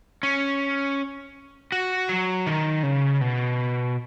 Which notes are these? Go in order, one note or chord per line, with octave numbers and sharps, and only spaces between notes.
C#4
F#4
F#3
D#3
C#3
B2